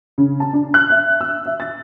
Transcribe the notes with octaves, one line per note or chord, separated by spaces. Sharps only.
C#3
A5
D4
F#6
E5
E6
E5
A6